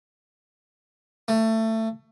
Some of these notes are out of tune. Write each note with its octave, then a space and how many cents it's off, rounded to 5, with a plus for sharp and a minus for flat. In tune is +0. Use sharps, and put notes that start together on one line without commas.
A3 +20